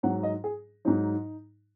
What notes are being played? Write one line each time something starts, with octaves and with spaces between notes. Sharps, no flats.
G#2 F#3 F#5
D#5
G#4
G#2 F#3 D#4